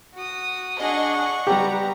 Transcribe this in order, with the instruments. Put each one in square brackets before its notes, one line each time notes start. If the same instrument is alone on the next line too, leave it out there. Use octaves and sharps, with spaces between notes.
[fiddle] F#4 D#6
[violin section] D4 G#4 D#5 [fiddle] F#5 C#6
[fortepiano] G3 G4 [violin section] B3 A#5